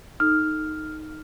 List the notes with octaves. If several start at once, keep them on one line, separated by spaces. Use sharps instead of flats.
D#4 A4 F6